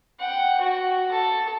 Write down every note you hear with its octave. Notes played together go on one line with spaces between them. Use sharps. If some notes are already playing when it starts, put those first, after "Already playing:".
F#5 G5
F#4
A4